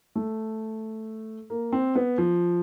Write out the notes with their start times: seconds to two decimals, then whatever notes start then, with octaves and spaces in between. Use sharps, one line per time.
0.15 A3
1.50 A#3
1.72 C4
1.95 B3
2.18 F3